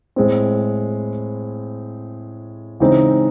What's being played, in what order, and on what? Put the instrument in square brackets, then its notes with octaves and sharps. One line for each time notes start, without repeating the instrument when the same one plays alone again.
[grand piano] A2 G#3 C4
C#3 E3 G#3 C4 D#4